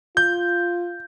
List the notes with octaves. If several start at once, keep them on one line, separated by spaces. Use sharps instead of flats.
F4 G6